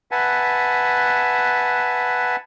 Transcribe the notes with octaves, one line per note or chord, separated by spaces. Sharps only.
B4 E5 F#5 G#5 A5